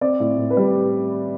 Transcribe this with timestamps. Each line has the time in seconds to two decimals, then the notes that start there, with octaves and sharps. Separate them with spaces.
0.01 C4 D5
0.20 A2
0.38 A2
0.50 B4
0.57 G3